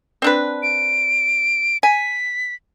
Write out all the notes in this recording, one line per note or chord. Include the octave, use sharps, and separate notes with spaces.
C4 D4 B4
D7
G#5 B6